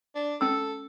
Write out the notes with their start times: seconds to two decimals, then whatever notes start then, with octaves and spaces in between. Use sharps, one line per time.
0.15 D4
0.41 C#4 A4 E6